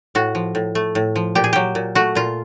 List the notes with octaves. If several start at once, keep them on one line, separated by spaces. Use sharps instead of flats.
A2 F#4
F3
A2
A3
A2
F3
A#2 G4
G#4
F#3 G4
A#2
A3 F#4
A#2 F4